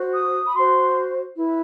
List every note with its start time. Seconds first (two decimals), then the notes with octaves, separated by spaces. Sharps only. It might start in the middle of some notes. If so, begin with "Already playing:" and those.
Already playing: F#4 C5
0.13 D#6
0.44 B5
0.53 F#4 C5 C6
1.35 E4 B4